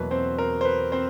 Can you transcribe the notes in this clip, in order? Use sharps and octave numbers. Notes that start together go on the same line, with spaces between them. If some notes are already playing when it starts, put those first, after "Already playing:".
Already playing: E2 B2 F#3 A#3 B4
C4 C5
A#4
C5
B4
C4 C5